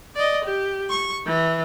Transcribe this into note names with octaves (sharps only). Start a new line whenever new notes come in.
D5 D#5
G4
C#6
E3